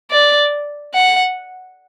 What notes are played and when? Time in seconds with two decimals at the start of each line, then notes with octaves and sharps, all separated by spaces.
0.11 D5
0.94 F#5